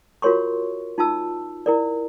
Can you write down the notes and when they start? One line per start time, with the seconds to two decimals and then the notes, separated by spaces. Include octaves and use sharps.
0.22 F4 F#4 A#4 C#5 C6 C#6
0.98 D#4 F4 A5 E6
1.66 E4 A#4 D5